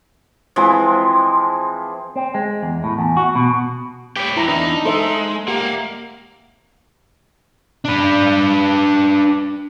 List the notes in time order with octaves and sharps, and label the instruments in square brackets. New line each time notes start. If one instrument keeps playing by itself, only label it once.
[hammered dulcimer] E3 F3 G#3 C4
[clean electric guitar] C4
G#3
E2
A2
E2
F#4
B2
[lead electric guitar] G4 C#5 [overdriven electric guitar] B4 G5
[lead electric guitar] E2 [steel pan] E4 A#5
[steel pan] D4 A#5 [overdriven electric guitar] D#4
[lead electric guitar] G#3 [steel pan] A4 C5 E5
[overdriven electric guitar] A#3 [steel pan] G4 [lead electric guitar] F5 F#5
[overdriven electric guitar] D4 B4